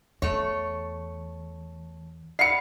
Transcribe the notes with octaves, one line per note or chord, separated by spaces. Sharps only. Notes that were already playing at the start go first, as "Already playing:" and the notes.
E2 A3 C#5
D5 F5 F#5 B5 C7 C#7